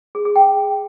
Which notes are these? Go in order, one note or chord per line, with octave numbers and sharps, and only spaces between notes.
G#4
G#4
G5